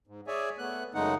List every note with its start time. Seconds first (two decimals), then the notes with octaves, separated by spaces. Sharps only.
0.07 G#2
0.27 G#4 C#5 D5 E5 G#5
0.58 A3 B3 F#6
0.94 F#2 C#3 G#3 A3 D#4 F#5